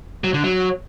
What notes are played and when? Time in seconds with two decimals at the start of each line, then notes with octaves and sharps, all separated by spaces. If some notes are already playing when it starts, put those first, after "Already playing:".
0.24 F#3
0.34 D3
0.44 F#3